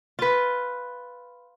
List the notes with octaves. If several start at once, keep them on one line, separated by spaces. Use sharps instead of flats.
F4 B4